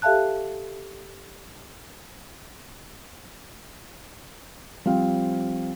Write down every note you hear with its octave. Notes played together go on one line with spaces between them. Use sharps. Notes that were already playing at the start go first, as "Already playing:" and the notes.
G4 A4 E5 F5 A5 F#6
F3 G3 C4 F5